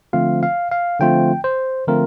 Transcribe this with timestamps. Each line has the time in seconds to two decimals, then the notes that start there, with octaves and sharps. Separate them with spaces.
0.13 D3 F3 A3 C4 F4 F5
0.43 F5
0.71 F5
1.00 D3 F3 A3 C4 F4 G5
1.44 C5
1.88 D3 F3 A3 C4 F4 A#4